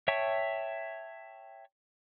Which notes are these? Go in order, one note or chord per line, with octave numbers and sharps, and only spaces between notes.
C#5 E5 G5 A5 C#6